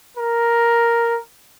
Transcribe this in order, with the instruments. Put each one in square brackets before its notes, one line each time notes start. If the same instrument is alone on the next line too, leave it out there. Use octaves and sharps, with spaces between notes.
[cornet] A#4